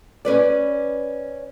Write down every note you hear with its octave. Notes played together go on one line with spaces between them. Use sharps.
C#4 B4 D5